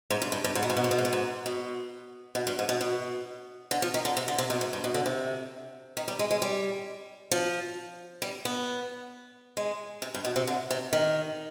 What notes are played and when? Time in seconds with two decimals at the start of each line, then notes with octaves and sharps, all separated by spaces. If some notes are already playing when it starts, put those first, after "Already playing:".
0.10 G#2
0.22 G2
0.32 G2
0.44 G2
0.55 G#2
0.63 B2
0.70 G#2
0.77 B2
0.84 G#2
0.91 B2
0.98 G#2
1.05 B2
1.13 G#2
1.46 B2
2.35 B2
2.47 G2
2.59 G#2
2.69 B2
2.81 B2
3.71 D3
3.82 F3
3.94 D#3
4.05 D3
4.17 C3
4.28 D3
4.38 C3
4.50 B2
4.61 G#2
4.73 G2
4.84 B2
4.94 D3
5.06 C3
5.97 D#3
6.08 G3
6.19 G#3
6.31 G#3
6.42 G3
7.31 F3
8.22 G3
8.45 B3
9.57 G#3
10.02 C3
10.14 G2
10.25 B2
10.36 C3
10.47 D3
10.70 C3
10.93 D#3